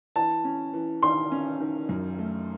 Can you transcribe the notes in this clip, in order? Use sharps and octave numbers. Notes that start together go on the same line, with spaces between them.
E3 A5
C#4
E3
D#3 C6
C#4
D#3
F#2
A3